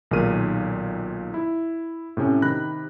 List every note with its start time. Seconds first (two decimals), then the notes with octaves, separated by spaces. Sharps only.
0.11 B1 A#2 D#3 G#4 F6 D#7
1.34 E4
2.17 A2 C3 C4 C#4
2.42 C3 D#3 B5 F#6 A#6